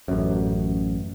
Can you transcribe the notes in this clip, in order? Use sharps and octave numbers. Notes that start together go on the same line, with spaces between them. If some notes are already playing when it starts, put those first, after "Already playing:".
A1 F#2